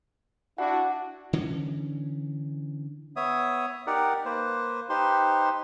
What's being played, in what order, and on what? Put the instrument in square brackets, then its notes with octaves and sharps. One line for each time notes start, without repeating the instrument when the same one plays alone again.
[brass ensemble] D4 E4 F#4 [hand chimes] F#5
[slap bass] D3 E3 C#4
[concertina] B3 C#5 E5 D#6
D#4 G4 A#4 D5 F#5
A#3 B4 C5
D#4 G4 B4 C5 C6